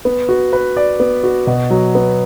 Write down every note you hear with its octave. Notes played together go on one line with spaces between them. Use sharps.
B3
F#4
B4
D5
B3
F#4
B2
F#3
B3